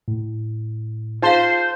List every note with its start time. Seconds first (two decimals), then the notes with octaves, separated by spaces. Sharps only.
0.08 A2
1.22 D#4 F4 G#4 C5 F5 A5 C6